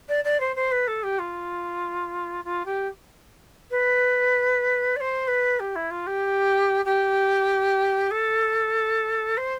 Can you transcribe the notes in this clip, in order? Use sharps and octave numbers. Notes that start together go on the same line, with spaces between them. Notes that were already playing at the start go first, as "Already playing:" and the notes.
D5
D5
C5
C5
B4
A4
G4
F4
F4
G4
B4
D5
C5
B4
G4
E4
F4
G4
G4
A4
C5